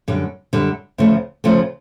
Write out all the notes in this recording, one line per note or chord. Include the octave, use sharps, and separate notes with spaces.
F#2 D3 G3
F#2 D3 G3
D2 C#3 F3 A3
D2 C#3 F3 A3